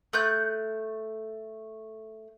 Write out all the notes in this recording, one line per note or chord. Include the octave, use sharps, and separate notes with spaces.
A3 F#6 G6